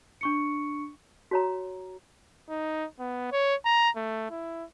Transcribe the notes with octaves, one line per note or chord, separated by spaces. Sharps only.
D4 C#6 C#7
F#4 C#5 A#5
D#4
B3
C#5
A#5
A3
E4